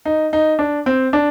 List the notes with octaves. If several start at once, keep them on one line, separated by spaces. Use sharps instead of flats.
D#4
D#4
D4
C4
D4